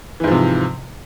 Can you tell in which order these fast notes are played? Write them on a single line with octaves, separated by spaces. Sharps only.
E3 G#2 F3 C3